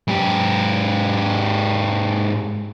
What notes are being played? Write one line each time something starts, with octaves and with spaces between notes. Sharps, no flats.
G#2 G4